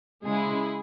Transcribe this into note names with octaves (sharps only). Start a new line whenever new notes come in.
C#3 G#3 E4 G#4